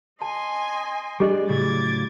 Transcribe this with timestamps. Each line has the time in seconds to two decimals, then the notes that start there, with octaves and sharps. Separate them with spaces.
0.22 D#5 G#5 A5 C6
1.20 G3 D4 G4 G#4 D5 D#5
1.49 A2 C#3 F#3 D6 G#6 A6